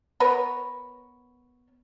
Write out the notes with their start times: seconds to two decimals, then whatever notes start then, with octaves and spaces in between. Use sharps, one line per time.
0.20 B3 A#4 B4 C#5